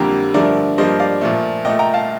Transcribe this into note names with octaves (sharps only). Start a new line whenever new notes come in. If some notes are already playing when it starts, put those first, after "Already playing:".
Already playing: F2 D3 G3 A#3 G4 A#4
G2 D3 F3 A3 A#4 D5
G2 F3 A#3 C5 D#5
D5 F5
A#2 F3 A3
A#2 A3 D#5 G5
G5 A#5
F5 A5